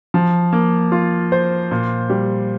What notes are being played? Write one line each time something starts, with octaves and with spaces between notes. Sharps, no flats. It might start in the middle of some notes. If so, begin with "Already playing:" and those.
F3
A#3
F4
C5
A#2
G3